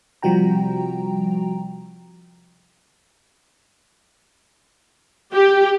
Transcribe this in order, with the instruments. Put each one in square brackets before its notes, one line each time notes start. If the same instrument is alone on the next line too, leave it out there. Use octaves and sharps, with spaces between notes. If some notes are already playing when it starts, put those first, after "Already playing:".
[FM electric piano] C3 F3 G3 F#4 G5 A#5
[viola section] G4